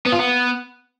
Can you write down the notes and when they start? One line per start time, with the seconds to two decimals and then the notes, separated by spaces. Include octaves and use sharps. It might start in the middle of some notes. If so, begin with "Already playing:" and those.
0.06 B3
0.13 F4
0.19 B3